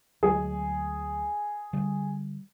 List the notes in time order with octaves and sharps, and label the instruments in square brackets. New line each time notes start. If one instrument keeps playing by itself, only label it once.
[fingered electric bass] D2 F#3 G#3 [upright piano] G#4
[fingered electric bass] D3 G3